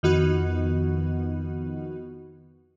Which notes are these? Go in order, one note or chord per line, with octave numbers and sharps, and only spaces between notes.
F2 D#3 B3 F#4